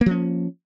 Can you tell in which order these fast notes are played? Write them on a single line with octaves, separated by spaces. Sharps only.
A#3 F3 C#4